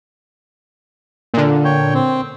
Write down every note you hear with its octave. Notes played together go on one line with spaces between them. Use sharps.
A#2 D3
C#5 G5
C4